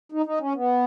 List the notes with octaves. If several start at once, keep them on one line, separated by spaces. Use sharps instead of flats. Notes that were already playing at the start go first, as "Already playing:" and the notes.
D#4
D#4
C#4
B3